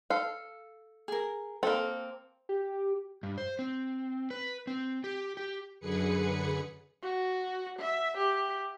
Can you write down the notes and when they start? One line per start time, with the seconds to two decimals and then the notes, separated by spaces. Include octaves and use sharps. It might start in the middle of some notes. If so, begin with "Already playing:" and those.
0.10 A4 F5
1.08 G#4 A#4
1.63 A#3 C4 A4
2.49 G4
3.23 G2
3.38 C5
3.59 C4
4.31 B4
4.67 C4
5.04 G4
5.37 G4
5.80 F#2 D3 G#4 B4 C#7
7.02 F#4
7.79 E5
8.17 G4